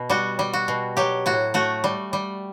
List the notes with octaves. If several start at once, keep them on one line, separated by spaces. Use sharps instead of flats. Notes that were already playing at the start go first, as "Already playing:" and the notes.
Already playing: B2
G3 F#4
G3
F#4
B2
F#3 G4
A2 F#4
A3 F#4
G3
G3